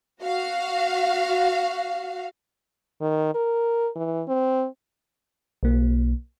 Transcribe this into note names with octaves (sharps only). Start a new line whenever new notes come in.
F#4 F5
D#3
A#4
E3
C4
B1 A#3